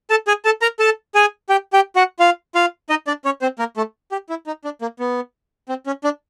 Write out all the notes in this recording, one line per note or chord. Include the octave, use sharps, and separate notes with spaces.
A4 A5
G#4 G#5
A4 A5
A#4 A#5
A4 A5
G#4 G#5
G4 G5
G4 G5
F#4 F#5
F4 F5
F4 F5
D#4 D#5
D4 D5
C#4 C#5
C4 C5
A#3 A#4
A3 A4
G4
E4
D#4
D4
A#3
B3
C4
C#4
D4